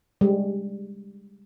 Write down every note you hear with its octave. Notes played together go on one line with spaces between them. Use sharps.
G3 G#3